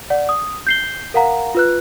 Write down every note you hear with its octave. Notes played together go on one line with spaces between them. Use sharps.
D5 F#5
D#6
G6 C7 G7
A#4 F5 F#5 A#5
F4 B4 F#6